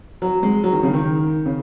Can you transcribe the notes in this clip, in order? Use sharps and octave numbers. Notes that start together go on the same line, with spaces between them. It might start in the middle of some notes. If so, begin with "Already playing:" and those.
F#3
G#3
F#3
D#3
C#3
D#3
C#3